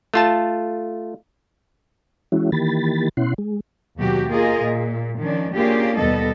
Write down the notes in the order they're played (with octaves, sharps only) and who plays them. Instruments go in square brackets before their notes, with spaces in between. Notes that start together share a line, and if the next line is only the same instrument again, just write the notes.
[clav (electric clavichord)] A3 F4 A5
[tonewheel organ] E3 G#3 C#4 E4 F#4
D#3 E3 A#3 G4 B5 A6
B2 C#4 E4 F#5 C6
G#3
[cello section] D#2 B2 F#3 F#4 G4
A#3 F4 G#4 A#4 D#5
A#2
D#3 F3 C#4 D4
A#3 C#4 D4 F4 G4 G#4
D#2 B2 G3 B3 A4 D#5